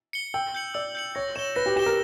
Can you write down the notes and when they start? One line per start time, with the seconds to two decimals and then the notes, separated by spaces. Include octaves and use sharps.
0.13 C#7 G7
0.34 G5 E6
0.55 G6 C#7 F#7
0.74 D5 E6
0.95 G6 C#7 F#7
1.15 C#5 A#6
1.36 C#5 E7
1.39 G7
1.56 B4 A#6
1.66 G4
1.76 G4 E7 G7
1.86 A#4